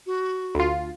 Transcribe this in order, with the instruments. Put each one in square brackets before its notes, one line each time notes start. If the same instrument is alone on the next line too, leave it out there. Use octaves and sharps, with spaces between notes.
[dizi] F#4
[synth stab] D2 F4